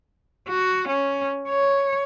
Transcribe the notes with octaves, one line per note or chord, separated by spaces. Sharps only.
F#4
C#4
C#5